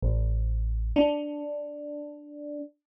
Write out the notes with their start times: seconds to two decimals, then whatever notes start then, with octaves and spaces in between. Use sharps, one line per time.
0.02 A1
0.96 D4